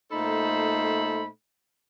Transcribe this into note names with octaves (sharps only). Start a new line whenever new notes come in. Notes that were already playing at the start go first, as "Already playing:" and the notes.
A#2 A3 D#4 A4 C5 B5